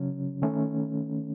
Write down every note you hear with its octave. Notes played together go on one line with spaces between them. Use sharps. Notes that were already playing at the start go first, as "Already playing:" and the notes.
Already playing: C#3 F#3 C#4
D#3 A3 C#4